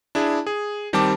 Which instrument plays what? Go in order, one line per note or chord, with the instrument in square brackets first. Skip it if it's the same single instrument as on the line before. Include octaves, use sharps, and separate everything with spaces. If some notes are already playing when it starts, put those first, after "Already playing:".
[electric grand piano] D4 E4 G#4
G#4
D#3 G3 C4 G4 A5 D6